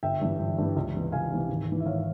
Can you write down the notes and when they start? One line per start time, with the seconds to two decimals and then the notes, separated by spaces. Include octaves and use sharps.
0.03 G1 E5 G5
0.21 G2 E3
0.39 G1
0.58 G2 E3
0.76 C#2
0.94 C3 E3
1.12 C#2 F5 G#5
1.31 C3 E3
1.49 G#1
1.68 G#2 E3
1.80 E5
1.86 G#1 C#5 F5